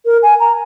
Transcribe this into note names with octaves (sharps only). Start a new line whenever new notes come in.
A#4
G#5
A#5